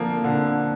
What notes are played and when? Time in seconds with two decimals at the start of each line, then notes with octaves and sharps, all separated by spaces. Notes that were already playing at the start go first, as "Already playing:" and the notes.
Already playing: D3 F3 A#3
0.24 D3